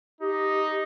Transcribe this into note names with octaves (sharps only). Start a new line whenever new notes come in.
D#4 G4